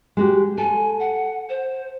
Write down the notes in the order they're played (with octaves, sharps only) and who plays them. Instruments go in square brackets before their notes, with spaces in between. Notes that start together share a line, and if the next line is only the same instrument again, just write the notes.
[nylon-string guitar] G#3 F#4 G4
[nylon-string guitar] A4 [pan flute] G#5
[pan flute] F#5
C5